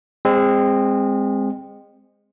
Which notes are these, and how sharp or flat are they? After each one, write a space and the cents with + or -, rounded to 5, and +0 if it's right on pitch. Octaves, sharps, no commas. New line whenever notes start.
G#3 -25 C4 +0